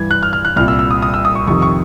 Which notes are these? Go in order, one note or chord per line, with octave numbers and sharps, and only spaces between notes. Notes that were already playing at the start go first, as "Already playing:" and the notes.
Already playing: G2 E3 G#6
F#6
F6
F6
F#6
C2 A#2 F6
E6
E6
D#6
D#6
E6
D#6
C#6
F2 C3 D#3 C#6
C#6